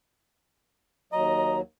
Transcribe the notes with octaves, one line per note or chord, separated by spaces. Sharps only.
D#2 F#3 D#5 A#5